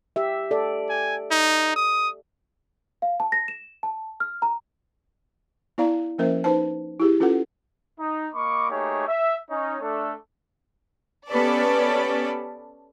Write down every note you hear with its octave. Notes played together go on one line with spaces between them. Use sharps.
G4 E5
A4 D5
G#5
D#4
D#6
F5
A5
A#6
E7
A5
F6
A#5
B3 E4 D5 F5 A#5
F3 A#3 C#4 A#4 C5 E5
D#4 B4 C5 A5
E4 G4 G#4
C#4 F4 A4 B4 F#5
D#4
A#3 D#5 B5 C#6 D6
A3 A#3 D#4 G4 G#4 C#5
E5
C#4 D#4 C#5
A3 D4 A4
B3 C#4 G4 A4 B4 D5